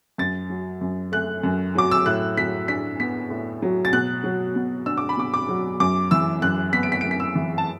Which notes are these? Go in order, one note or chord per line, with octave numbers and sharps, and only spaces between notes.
F#2 A6
F#3
F#2
A3 F#6
F#2
F#3 D6
E6
A2 F#6
F#3 B6
D4 B6
B3 B6
A2
F#3
A6
B2 F#6
F#3
B2
D4 E6
D6
B5
B2 D6
D6
F#3
F#2 D6
E3 E6
F#2 F#6
B3 B6
D7
B6
D7
F#2
B6
E6
E3
A5